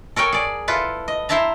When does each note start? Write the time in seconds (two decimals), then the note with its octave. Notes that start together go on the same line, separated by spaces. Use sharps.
0.16 A4 A#4 C#5 G5 G#5
0.33 G#4 D5
0.68 E4 F4 A4 B4
1.08 D#5
1.29 E4 C5 E5 A5 A#5